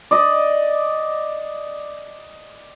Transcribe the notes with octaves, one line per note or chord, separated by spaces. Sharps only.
D5 D#5